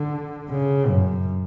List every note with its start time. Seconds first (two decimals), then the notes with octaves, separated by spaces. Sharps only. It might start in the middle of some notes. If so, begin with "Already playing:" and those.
Already playing: D3
0.50 C#3
0.88 F#2